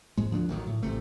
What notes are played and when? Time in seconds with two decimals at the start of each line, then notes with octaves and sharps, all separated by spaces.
0.17 G#2 G#3
0.31 D2 F3 B3 D4
0.49 A1 D#3 F#3
0.67 A2
0.83 A1 C3 A3